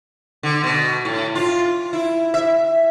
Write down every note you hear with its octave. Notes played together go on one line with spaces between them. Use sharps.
D3
B2
A2
F4
E4
E5